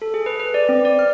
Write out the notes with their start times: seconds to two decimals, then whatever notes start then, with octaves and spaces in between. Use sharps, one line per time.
0.02 A4
0.14 G#4
0.26 B4
0.40 B4
0.54 D5
0.69 C4
0.85 D5
0.99 F6